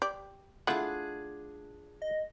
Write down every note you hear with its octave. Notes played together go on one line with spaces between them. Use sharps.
G4 D5
A3 D4 E4 F4 G#4 F#5
D#5